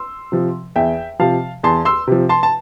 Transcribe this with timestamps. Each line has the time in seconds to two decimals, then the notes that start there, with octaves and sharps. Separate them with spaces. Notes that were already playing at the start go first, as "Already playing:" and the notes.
Already playing: C6 E6
0.32 C3 F3
0.76 E2 E5 G5
1.19 C3 F3 F5 A5
1.63 E2 A5 C6
1.85 C6 E6
2.07 C3 F3
2.29 A5 C6
2.43 A5